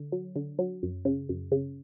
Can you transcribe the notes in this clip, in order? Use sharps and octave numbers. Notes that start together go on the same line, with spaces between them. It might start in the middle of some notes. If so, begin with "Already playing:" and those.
Already playing: D3
F#3
D3
F#3
F#2
C#3
F#2
C#3